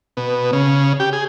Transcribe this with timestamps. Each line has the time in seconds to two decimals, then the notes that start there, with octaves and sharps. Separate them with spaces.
0.17 B2
0.53 C#3
1.00 G4
1.13 G#4